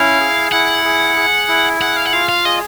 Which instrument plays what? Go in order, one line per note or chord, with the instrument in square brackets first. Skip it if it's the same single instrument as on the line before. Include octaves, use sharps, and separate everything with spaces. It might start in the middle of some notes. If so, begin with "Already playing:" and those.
Already playing: [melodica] C#4 E4 [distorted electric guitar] F5
[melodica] G#4
[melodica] E4 [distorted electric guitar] F#5
[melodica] G#4
G#4
E4
[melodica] G#4 [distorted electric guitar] F#5
[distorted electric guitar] F5
F#5
[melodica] F4 [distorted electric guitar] F5
[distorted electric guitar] F5
[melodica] G#4 [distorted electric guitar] D#5